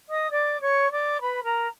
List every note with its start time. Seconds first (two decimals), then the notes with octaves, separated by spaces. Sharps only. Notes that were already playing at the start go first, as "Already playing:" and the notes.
0.09 D#5 D#6
0.31 D5 D6
0.61 C#5 C#6
0.92 D5 D6
1.21 B4 B5
1.44 A#4 A#5